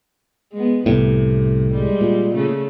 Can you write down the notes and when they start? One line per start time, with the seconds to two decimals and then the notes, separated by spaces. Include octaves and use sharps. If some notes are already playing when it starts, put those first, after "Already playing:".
0.53 G#3 B3
0.86 C2 A2 C3
1.72 G3 G#3
2.01 A#2
2.35 C#3 A3